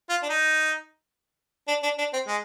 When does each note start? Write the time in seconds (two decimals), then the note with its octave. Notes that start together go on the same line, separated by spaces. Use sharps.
0.09 F4
0.23 D4
0.29 D#4
1.68 D4
1.83 D4
1.98 D4
2.13 C4
2.27 G#3